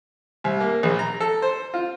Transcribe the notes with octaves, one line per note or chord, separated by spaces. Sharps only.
C2
A#3
A#1
A#5
A4
C5
F4